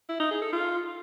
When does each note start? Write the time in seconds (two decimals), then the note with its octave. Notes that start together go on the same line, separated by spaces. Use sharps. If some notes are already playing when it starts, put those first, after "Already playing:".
0.09 E4
0.20 D#4
0.31 G#4
0.42 A4
0.53 F4